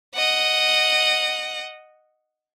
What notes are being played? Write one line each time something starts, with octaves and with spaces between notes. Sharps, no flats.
D#5 F#5